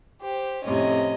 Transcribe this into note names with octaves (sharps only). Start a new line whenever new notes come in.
G4 C5
F2 A2 C3 C#4 D#5